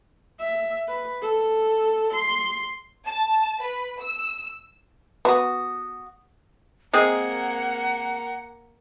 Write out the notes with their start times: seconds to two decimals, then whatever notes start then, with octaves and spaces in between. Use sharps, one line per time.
0.40 E5
0.88 B4
1.22 A4
2.14 C6
3.05 A5
3.63 B4
4.00 E6
5.25 B3 F#4 D#6
6.93 G#3 A#3 C4 G#4 A#4 F#5